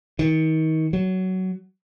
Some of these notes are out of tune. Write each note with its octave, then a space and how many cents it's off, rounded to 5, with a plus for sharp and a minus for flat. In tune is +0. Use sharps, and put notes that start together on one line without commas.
D#3 +30
F#3 +15